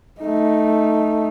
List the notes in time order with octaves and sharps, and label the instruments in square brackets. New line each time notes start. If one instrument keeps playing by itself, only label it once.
[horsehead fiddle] A3 D#4